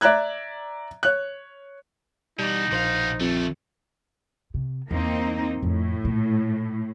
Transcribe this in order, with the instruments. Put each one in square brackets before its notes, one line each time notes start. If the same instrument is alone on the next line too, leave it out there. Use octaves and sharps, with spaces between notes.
[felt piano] D5 E5 A#5 F#6 G#6
C#5 F#6
[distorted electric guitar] B2 E3 [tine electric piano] G3 [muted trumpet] D#4
[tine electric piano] A#1 C5 [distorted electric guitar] B2 F5
[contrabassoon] F2 [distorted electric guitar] D#3 A3
[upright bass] C3
[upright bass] E2 [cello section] A#3 C4 D#4
[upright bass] F2 [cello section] A2
[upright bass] A#2 E4